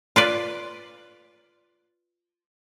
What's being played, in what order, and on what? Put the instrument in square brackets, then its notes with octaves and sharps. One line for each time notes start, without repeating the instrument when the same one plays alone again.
[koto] F4 B4 D5